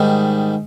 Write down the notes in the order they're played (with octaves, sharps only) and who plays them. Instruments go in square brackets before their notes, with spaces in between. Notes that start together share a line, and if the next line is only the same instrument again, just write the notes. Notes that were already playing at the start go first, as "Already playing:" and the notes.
Already playing: [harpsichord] G#2 D#3 G3